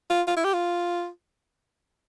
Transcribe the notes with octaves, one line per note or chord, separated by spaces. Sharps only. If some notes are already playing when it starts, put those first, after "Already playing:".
F4
F4
E4
G4
F4